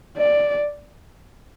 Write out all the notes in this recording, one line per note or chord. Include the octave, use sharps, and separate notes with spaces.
D5